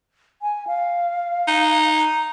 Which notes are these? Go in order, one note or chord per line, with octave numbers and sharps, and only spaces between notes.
G#5
F5
D#4
A#5